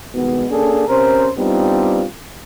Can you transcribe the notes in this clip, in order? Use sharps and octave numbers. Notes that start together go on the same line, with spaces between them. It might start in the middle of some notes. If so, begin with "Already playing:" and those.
C2 B2 D#3 G#3 B3
A#3 C#4 D4 G#4 A4
C3 C#4 A#4 C5
G3 B3 C4 D4 D#4 F4